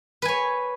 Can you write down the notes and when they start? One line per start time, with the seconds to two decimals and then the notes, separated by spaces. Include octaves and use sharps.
0.22 B4
0.25 G#5
0.28 C#5